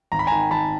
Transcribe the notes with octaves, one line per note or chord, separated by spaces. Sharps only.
G#1 A#5
B5
G#5 A#5
D#3
D#3 A5 B5